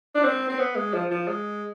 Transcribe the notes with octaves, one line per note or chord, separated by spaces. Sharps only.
D4
C4
C4
B3
G#3
F3
F3
G#3